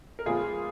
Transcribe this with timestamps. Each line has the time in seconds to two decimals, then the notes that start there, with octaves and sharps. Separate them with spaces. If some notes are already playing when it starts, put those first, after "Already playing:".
0.19 A#4
0.26 A#2 F3 G#3 B3 F4 G#4